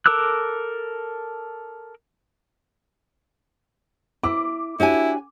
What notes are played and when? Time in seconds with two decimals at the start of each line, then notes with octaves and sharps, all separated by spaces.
0.06 A4 A#4 D6 E6 F#6
4.23 E4 D6
4.80 D4 E4 F#4 G4 C#5 G#5